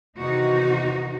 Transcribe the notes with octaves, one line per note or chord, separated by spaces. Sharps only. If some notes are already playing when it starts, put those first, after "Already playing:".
E2 C3 D#3 D#4 F#4